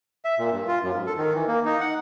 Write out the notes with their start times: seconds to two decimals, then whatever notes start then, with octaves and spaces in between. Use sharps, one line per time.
0.25 E5
0.39 A#2
0.52 G2
0.68 F4
0.82 F#2
0.94 G#2
1.06 A4
1.18 D#3
1.34 E3
1.48 A#3
1.66 D#4
1.81 F#5